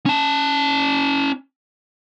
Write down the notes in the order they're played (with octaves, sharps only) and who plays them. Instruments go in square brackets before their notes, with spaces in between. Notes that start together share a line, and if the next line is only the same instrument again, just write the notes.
[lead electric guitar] C#4 A5